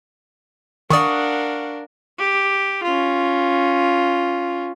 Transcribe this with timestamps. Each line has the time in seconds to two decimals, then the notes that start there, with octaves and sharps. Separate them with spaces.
0.90 D#3 D4 A#4 D5 F5 F#5 C#6 D#6
2.18 G4
2.83 C#4 F4